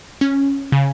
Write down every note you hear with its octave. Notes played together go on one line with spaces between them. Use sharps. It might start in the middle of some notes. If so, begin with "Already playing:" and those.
C#4
C#3